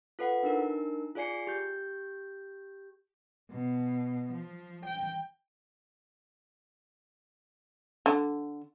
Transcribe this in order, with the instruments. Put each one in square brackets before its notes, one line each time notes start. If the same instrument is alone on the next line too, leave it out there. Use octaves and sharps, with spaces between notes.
[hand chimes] F4 A4 B4 F#5
D4 D#4 A#4
F4 G#4 D5 G#5 C7 C#7
G4 G6
[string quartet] B2
F3
G5
[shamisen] D3